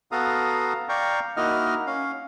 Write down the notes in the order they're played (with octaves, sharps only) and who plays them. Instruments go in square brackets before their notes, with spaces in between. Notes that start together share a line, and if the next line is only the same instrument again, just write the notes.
[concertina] B3 F#4 A4 F5 A#5 D#6
D5 F5 G5 A#5 C#6
A#3 D#4 E4 F#4 D#5 F6
C#4 F5